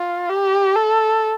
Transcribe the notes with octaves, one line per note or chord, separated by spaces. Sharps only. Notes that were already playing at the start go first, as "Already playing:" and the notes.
Already playing: F4
G4
A4